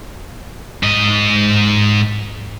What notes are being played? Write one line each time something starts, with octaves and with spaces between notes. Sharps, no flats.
G#2 D#5